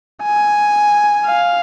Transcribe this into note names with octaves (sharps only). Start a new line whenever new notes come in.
G#5
F5